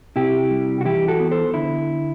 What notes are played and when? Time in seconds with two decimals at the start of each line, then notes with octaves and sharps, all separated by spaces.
0.16 C3 E4 G4
0.51 G3
0.81 F#4
0.85 E3 E4 G4
1.08 F#4 A4
1.20 B3
1.31 A4 C5
1.54 D3 E4